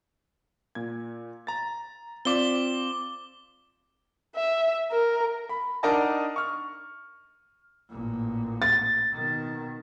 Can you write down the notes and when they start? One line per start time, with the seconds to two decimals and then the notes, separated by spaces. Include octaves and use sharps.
0.75 A#2 G#6
1.47 A#5 A6
2.25 C4 F4 D5 D6 G7
4.35 E5
4.92 A#4
5.49 B5
5.83 D4 D#4 A#4 D#5 F#5 A5
6.36 C#6 F6
7.90 A1 A#2
8.62 A6
9.12 B2 D#3